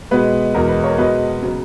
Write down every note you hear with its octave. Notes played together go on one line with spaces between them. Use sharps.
B2 G#3 B3 B4
E2 B2 G#3 A#4
B4
A#4 C#5
B2 G#3 B3 B4 D#5
C#3 F#3 B3